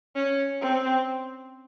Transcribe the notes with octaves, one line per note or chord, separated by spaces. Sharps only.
C#4
C4